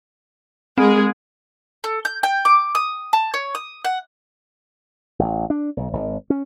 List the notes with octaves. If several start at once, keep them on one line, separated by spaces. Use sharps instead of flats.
G#3 C4 G#4
A4
G6
G5
D6
D#6
A5
C#5
D#6
F#5
A1
D4
B1
G#1
C#4